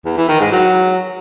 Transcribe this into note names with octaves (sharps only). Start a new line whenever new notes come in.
E2
E3
D#3
G#2
F#3